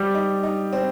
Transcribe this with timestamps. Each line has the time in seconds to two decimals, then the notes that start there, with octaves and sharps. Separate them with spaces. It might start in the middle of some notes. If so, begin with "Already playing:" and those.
Already playing: G3 C4 F#4
0.15 D#4
0.43 D#4
0.73 C4